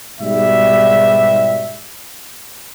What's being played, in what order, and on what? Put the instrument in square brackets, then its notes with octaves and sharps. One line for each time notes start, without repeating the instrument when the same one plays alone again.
[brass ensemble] G#2 B2 G3 E5